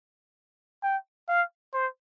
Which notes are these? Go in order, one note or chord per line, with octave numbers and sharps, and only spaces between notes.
G5
F5
C5